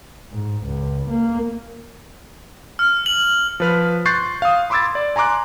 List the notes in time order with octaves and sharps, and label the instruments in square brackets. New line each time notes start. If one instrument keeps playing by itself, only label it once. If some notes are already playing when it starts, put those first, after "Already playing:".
[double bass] G#2
C#2
A#3
[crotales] F6
F#7
[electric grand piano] F3 B4 F6
C6 C#6 F#6 G6 A6 C7
F5 D#6
B5 C6 D6 E6 G#6 A6
D5
G#5 A#5 C6 D6 F#6